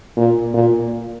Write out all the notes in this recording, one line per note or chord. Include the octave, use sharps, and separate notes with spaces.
A#2
A#2